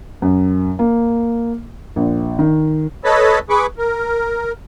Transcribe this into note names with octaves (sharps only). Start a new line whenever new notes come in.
F#2
A#3
A#1
D#3
A4 B4 C#5 D#5 A5 B5
G#4 B4 B5 C#6 D6
A#4